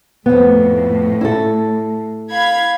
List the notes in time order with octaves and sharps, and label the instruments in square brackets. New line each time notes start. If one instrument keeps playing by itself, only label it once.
[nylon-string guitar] F2 B3 [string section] A2
[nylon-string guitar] E4 A4
[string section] F5 B5 G#6